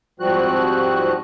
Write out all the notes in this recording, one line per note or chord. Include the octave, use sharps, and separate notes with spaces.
G#2 F3 G3 C4 F#4 F#6